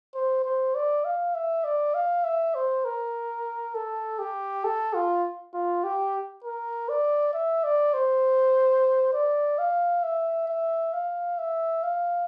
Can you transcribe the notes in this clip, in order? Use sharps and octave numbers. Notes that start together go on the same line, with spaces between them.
C5
C5
D5
F5
E5
D5
F5
E5
C5
A#4
A4
G4
A4
F4
F4
G4
A#4
D5
E5
D5
C5
D5
F5
E5
E5
F5
E5
F5